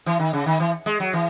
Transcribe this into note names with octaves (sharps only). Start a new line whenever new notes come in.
E3
D#3
C#3
D#3
E3
G#3
F#3
E3